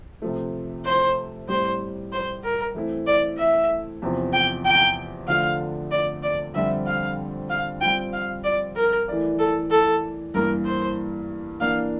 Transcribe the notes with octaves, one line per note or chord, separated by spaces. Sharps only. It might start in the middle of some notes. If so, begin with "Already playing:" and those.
C3 F3 A3
C5
A2 G3 C4 G4 C5
C5
A#4
E3 A3 C4 E4
D5
E5
E2 C3 F3
G5
G5
D3 F3 A3 D4 F5
D5
D5
F2 D3 G3 C4 E5
F5
F5
G3 C4 F4 G5
F5
D5
A#4
E3 A3 E4 A#4 D5
A4
A4
G2 E3 A#3 A#4
C5
E3 A#3 D4 F5